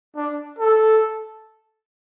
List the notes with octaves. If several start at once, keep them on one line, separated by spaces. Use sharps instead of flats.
D4
A4